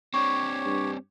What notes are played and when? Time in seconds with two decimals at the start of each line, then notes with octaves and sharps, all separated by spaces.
0.14 C4 D4 G4 C#5 C#6
0.66 G2